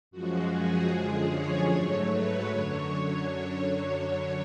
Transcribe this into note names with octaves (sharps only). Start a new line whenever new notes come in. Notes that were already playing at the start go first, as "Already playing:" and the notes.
F#2 F3 G#3 F#4
G#4
F#2 D3 F3 G#3
C#5
G#2 F#3 A3
B4
F#2 D3 F#3 C#5